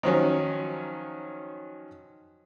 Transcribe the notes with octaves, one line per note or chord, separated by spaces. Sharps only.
D#3 F3 F#3 C#4